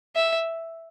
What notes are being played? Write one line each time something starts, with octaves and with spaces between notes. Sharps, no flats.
E5